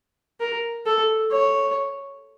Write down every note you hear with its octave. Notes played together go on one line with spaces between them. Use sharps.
A#4
A4
C#5